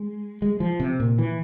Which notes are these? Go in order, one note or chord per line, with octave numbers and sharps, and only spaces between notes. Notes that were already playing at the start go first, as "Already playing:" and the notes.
Already playing: G#3
G#3
F3
C3
A#2
E3